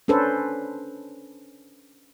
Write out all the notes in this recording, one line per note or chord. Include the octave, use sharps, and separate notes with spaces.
C#4 D4 A4 B4 C5